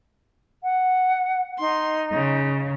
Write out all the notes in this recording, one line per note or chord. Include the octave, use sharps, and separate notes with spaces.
F#5
D#4 C6
C#3